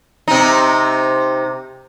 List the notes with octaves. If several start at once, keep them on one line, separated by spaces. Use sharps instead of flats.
C3 D#4